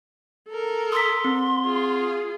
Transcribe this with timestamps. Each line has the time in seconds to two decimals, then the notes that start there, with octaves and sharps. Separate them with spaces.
0.49 A4 A#4
0.92 C6 D#6 E6 B6
1.25 C4
1.65 F4 G#4